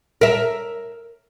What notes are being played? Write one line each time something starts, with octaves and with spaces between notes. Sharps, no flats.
A#4 E5